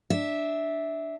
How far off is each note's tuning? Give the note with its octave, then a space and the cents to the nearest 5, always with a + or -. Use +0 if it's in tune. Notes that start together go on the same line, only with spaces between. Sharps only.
D4 +0 E5 -10